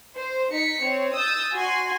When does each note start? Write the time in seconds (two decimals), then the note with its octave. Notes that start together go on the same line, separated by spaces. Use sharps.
0.16 C5
0.52 D#4 B6 C#7
0.82 C4 C#5
1.14 D#6 E6 G6 A6
1.53 F#4 G#5 C6